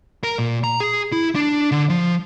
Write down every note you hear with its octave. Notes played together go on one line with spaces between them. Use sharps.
A#4
A#2
A#5
G#4
E4
D4
D3
F3